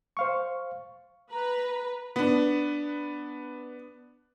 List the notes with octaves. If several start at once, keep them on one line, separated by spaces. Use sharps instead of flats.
C5 F5 C#6
B4 A#5
B3 D4